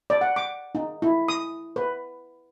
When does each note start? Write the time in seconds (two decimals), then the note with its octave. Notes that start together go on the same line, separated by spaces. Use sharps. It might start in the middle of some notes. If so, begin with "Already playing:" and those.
0.10 D5
0.21 F#5
0.36 D6
0.75 D#4
1.02 E4
1.28 D#6
1.76 B4